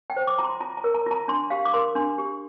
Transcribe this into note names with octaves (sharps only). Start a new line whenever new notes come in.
G5
C5
D6
F4 A#5
C6
F4 A#5
A#5
A#4
A#5
F4 A#5
D4 C6
G4 F5
D6
A#4 C6
D4 C6
G4